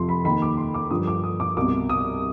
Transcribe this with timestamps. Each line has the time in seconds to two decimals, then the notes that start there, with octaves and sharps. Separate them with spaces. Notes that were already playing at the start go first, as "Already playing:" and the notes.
Already playing: F2 C3 F3 C6
0.09 B5
0.24 D#3 B5
0.28 D#2
0.42 D6
0.57 C6
0.74 D6
0.90 G2 D3 F3 D#6
1.07 D6
1.24 D#6
1.40 D6
1.56 C2 B2 D6
1.89 D#6